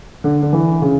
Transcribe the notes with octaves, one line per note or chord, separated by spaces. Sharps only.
D3
D3
E3
C#3